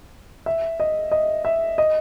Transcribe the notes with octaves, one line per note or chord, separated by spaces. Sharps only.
E5
D#5
D#5
E5
D#5